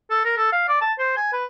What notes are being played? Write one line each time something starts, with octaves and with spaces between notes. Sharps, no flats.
A4
A#4
A4
F5
D5
A5
C5
G#5
B4